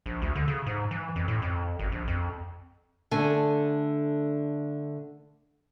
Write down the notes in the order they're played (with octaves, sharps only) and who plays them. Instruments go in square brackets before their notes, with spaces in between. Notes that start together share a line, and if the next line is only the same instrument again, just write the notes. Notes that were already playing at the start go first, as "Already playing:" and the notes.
[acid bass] A#1
D2
D3
C#3
G#2
E3
F2
A2
F2
G#1
A#1
F2
[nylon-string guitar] D3 A3 A4 G#5